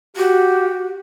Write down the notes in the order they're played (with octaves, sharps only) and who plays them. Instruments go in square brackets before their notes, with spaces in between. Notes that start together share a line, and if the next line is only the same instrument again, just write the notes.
[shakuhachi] F#4 [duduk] G4